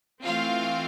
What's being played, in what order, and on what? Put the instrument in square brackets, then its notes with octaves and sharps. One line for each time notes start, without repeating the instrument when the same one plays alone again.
[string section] E3 A3 C4 F4 F5